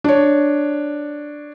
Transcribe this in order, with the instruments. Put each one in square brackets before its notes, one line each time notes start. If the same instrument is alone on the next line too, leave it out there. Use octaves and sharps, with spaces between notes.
[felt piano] D4 C#5